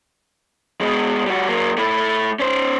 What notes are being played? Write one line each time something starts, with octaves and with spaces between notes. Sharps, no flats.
B2 G#3
G3 F#4
F#3 A#3
A3 E4
C#4 C5